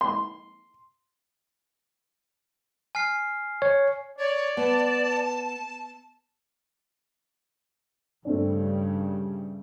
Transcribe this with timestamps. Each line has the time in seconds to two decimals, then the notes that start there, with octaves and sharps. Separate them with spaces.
0.01 C6
2.95 G#5 F6 C7
3.62 C#5
4.19 C#5 D5
4.57 B3 A5
8.25 G2 C#3 G3 A3 C4 D4